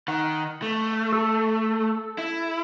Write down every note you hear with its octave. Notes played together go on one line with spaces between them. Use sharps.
D#3 F#5
A3
A4
E4